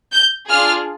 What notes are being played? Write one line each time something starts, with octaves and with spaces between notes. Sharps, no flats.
G6
D4 F4 G#4 F6